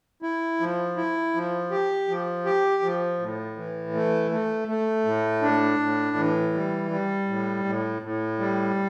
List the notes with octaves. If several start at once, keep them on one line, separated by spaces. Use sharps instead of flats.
E4
F3
E4
F3
G4
F3
G4
F3
A2
E3
A3
A3
A3
A2
D4
A2
E3
G3
G3
A2
A2
A2
G3